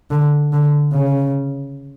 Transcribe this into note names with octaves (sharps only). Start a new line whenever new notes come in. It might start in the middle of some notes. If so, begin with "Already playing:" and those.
D3
D3
C#3